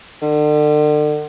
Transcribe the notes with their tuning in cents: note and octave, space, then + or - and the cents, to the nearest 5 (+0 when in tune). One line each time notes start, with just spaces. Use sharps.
D3 +40